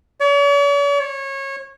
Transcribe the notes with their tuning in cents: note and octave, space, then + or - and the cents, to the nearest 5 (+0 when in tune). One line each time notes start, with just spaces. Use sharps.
C#5 +45
C#5 -25